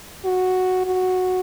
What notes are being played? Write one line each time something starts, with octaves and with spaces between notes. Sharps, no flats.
F#4
F#4